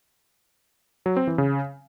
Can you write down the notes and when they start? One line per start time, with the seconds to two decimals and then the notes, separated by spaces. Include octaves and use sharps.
1.06 F#3
1.17 C4
1.27 E3
1.38 C#3